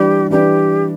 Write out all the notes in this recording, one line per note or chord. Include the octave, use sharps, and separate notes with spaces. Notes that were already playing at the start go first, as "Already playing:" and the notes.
Already playing: E3 G3 D4 G4
E3 G3 D4 G4